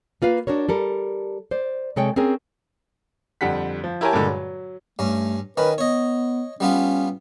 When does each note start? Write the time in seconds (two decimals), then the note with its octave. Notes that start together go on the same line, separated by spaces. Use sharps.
0.22 A#3 F4 B4 F5
0.47 D4 F#4 A#4 C#5
0.69 G3 A4 A#4
1.51 C5 D5
1.96 C3 G#3 A4 C#5 G5
2.16 C4 C#4 G#4 A#4
3.41 F2 D3 G3 F#5 B6
3.84 F3
4.01 E4 G4 A#4 C#5 G#5 A5
4.13 G2 A#2 D3 G#3
4.28 F#3
4.99 G2 A3 C#4
5.58 D#3 C#4 B4
5.78 B3 C#5 D#5
6.60 G3 B3 C#4 F4